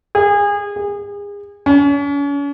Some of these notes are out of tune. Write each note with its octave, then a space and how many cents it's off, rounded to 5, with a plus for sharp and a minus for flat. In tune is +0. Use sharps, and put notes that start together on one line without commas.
G#4 -30
G#4 -35
C#4 +40